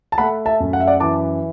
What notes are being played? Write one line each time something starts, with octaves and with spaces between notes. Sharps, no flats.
A5
A3 F#5 B5
E5 A5
F#2
F#5
E5
D5 F#5
E3 A5 D6